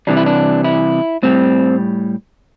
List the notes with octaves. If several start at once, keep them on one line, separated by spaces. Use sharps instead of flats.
C3 E3 G3 D4
E4
D4
E4
A2 G3 C4